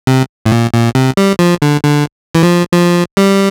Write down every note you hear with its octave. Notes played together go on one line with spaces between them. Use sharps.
C3
A2
A#2
A#2
C3
G3
F3
D3
D3
E3
F3
F3
G3